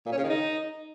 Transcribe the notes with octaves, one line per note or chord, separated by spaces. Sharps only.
A#2
C#4
C#3
D#3
D#4